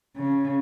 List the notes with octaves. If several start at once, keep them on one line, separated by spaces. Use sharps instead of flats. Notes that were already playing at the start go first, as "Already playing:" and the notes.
C#3